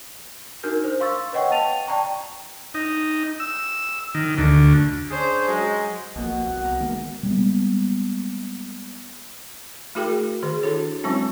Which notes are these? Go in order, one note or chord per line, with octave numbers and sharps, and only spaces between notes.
D4 D#4 F#4 A#4 F6 G6
C5
F5 C6 C#6 E6 A6
B4 C#5 D#5 F#5 G5 C#6
F5 G5 A5 A6 D#7 F7
D5 G5 A5 A#5 C#6
D#4
E6
D#3
D2
C#4 D4 G#4 C5
F#3 G#3
A#1 B2 A#3
C2 F#5
A#4
D#3 G#3 A#3
G3 G#3 A#3 B3
A3 E4 F#4 G#4 A#4 G5
D#3 G#4
D4 E4 F#4 A4 C#5
F#3 G#3 C4 C#4 E4